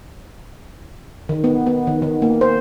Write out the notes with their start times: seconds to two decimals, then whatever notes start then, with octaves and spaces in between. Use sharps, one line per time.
1.29 D#3
1.44 B3
1.66 B3
1.87 D#3
2.02 D#3
2.22 A#3
2.41 C5